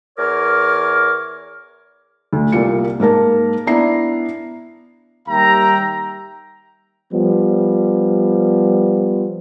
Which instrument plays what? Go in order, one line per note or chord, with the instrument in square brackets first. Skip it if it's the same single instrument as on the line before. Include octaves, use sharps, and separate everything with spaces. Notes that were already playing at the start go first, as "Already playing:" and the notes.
[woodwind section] E2 A#4 C#5 D6 F6
[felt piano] D2
C2 A#3 F4 C#7
G#2 A#3 A#4 A5
B3 D4 E4 A#5 C7
[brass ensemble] D#2 G3 E5 G5 A#5
[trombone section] F3 G3 B3